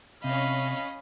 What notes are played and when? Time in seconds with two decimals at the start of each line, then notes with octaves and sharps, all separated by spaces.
0.24 C3 C#4 D#5 F5 B5